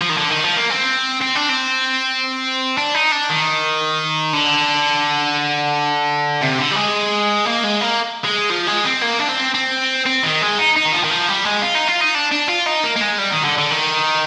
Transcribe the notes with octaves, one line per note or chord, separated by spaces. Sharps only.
F3
D#3
D3
D#3
F3
A#3
C4
C4
D4
C4
D4
D#4
D4
D#3
D3
C3
D3
G3
G#3
A#3
G#3
A#3
G#3
F3
G#3
C4
A#3
D4
C4
C4
C4
D#3
G#3
D#4
D#4
D#3
F3
D#3
F3
G3
G#3
F4
D#4
F4
D#4
D4
D4
F4
D#4
A#3
A#3
G#3
G3
D#3
D3
D3
D#3